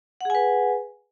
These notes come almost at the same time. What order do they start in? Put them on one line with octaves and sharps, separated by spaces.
F#5 G#4 G#5 B4